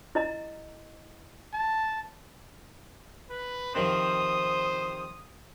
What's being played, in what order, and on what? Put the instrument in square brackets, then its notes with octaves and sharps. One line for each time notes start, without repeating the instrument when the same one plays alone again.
[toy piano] E4 D#5 A#5
[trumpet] A5
B4
[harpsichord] C3 D#3 F3 [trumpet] C5 [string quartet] D#6